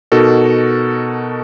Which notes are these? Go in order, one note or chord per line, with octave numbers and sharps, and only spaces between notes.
B2 D#4 F#4 A4 A#4